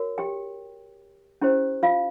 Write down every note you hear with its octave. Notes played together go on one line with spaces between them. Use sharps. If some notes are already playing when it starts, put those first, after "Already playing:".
Already playing: F#4 A#4 C#5
G4 G5
C#4 E4 G4 C5
F4 F5